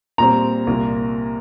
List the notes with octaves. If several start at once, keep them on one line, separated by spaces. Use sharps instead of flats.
A#2 G3 C4 A#5
C2 A#2 A#3